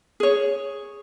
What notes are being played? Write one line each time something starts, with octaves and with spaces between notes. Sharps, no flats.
G#4 C#5